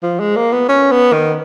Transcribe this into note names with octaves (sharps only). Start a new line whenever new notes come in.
F3
G#3
A#3
B3
C#4
B3
D#3